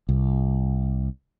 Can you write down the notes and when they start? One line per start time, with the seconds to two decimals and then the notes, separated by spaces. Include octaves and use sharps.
0.09 C2